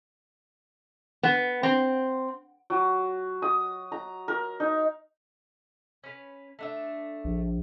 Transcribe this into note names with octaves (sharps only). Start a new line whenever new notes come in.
B3
C4
F#3
D#6
A#5
A#4
D#4
C#4 B4
A3 D4 E5
A#1